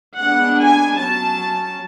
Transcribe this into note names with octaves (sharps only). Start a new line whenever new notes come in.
G#3 B3 D4 F#5
G#5
F#3 C#4 A5